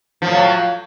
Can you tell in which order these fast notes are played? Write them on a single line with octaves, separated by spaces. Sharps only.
F3 A2 F#3